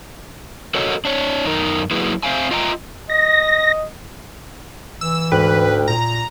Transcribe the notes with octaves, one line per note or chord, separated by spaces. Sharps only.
F#4 A4 A#4 C#5 D#5
D4 C#5
F#2 D#4 A#4
F#3 A#3 E4 F#4 G#4 B4
C4 C5 E5 F5 G#5
F4 D#5 G5 A#5
D#5 A#6
E3 E6
D2 G#2 B4 G5
A#2 A#5